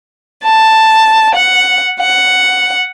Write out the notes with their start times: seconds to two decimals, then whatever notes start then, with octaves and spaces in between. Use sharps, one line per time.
0.44 A5
1.35 F#5
2.00 F#5